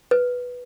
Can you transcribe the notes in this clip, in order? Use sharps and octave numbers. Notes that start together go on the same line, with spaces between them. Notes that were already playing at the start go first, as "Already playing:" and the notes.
B4